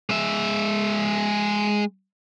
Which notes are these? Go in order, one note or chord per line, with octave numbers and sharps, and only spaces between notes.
G#3 E5